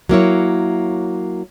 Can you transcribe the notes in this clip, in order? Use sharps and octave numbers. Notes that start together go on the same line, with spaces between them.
F#3 A#3 E4 C#5